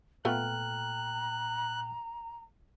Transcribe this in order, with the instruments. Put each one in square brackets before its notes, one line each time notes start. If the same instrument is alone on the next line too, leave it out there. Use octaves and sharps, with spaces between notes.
[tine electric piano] A#2 G5 F6 [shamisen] A3 B3 F4 [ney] A#5 [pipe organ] F#6